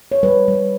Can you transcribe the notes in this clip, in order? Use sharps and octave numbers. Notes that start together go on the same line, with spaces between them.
C#5
G3 B4
G3